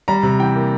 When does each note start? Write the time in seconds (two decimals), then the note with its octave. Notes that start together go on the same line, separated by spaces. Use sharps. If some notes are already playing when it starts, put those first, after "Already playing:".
0.08 G3 A#5
0.23 C3
0.39 E3 G5
0.56 A#3